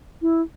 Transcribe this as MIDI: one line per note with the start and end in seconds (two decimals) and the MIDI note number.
0.22 0.41 64